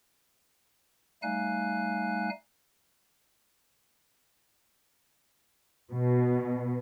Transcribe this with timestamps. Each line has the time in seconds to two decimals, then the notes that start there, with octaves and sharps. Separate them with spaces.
1.23 G3 A3 D#4 F5 G#5 F#6
5.93 B2